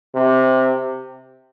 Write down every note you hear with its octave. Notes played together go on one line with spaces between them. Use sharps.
C3